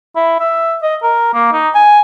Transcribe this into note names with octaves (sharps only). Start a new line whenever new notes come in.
E4
E5
D#5
A#4
A#3
D#4
G#5